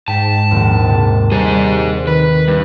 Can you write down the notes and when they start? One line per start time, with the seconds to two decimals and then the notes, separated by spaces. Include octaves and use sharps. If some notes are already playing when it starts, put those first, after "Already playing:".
0.08 G#2 G5 A5 B6
0.51 A#1 D#2
0.89 C3
1.32 G3 G#4 C5
2.07 D#3 B4
2.48 G2